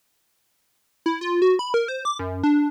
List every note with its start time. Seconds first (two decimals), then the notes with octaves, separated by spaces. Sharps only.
1.06 E4
1.21 F4
1.42 F#4
1.59 B5
1.74 A#4
1.88 C5
2.05 D6
2.19 F#2
2.43 D4